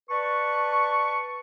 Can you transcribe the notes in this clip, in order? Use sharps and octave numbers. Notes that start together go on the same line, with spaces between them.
B4 D5 A5 C#6